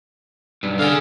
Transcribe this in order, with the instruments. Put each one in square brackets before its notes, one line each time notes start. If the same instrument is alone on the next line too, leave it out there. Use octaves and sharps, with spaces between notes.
[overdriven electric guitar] B1 G2
[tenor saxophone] D3 [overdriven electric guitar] G#4 F5